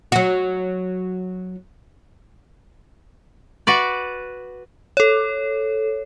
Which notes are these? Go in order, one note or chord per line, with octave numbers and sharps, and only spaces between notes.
F#3 F#4
F#4 B4 D5
A4 C#5